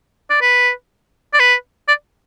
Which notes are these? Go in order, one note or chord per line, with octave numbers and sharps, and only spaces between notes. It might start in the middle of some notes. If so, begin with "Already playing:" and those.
D5
B4
D5
B4
D5